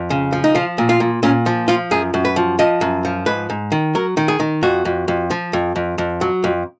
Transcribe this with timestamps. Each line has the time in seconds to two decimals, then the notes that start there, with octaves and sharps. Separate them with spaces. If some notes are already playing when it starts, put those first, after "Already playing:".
Already playing: F2
0.10 C#3
0.33 F3
0.44 D#4
0.55 F3 F4
0.78 A#2
0.89 F4
1.00 A#2
1.23 A#2 C#4
1.46 F3
1.68 F3 F4
1.91 F#2 G#4
2.14 F#2
2.25 B4
2.36 F3
2.59 F3 D#5
2.81 F#2
3.05 F3
3.26 G#2 B4
3.50 G#2
3.72 D#3
3.95 F#3 A#4
4.17 D#3
4.28 G#4
4.40 D#3
4.63 F2 F#4
4.85 F2
5.08 F2
5.31 F3
5.53 F2
5.76 F2
5.98 F2
6.21 F#3
6.44 F2